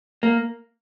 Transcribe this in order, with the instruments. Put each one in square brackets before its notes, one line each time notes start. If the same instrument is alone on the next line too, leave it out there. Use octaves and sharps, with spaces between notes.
[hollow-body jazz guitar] A#3